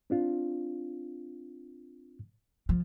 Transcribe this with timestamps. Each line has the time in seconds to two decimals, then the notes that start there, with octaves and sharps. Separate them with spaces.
0.10 C4 D4 F4
2.69 F3